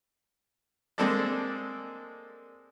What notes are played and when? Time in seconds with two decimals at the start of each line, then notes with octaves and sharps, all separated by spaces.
0.98 G#3 A#3 C4 D4 A4 D5